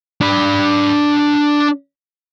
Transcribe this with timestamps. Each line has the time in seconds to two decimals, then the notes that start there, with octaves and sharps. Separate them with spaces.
0.21 D4 B5